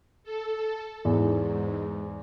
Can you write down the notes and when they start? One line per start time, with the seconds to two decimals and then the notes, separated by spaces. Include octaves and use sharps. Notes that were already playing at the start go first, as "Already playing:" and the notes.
0.24 A4
1.05 E2 G#2